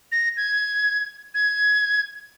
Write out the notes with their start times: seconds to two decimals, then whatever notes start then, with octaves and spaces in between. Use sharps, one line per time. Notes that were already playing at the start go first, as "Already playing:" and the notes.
0.12 A#6
0.37 G#6
1.34 G#6